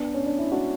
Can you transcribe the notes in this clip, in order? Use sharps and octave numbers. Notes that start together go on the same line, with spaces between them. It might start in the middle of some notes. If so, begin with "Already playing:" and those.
Already playing: B3 D4
C#4
D4
E4
D4 F#4